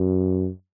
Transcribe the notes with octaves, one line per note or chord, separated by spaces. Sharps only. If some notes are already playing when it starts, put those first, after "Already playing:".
Already playing: F#2